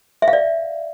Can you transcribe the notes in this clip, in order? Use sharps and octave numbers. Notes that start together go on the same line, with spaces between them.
E5
F5
D5